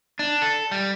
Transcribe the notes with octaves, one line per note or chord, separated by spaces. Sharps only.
D4
A4
G3